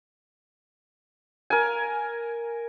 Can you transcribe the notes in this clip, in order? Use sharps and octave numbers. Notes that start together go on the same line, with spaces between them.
A#4 G#5